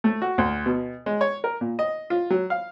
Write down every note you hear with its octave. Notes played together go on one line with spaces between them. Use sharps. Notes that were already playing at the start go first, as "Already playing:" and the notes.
A3
F#4
D2
B2
G#3
C#5
A#4
A#2
D#5
F4
F#3
F5